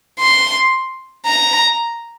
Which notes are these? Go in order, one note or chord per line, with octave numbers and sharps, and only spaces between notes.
C6
A#5